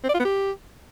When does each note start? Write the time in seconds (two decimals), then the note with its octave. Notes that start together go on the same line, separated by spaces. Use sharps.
0.04 C4
0.09 D5
0.14 F4
0.20 B3
0.25 G4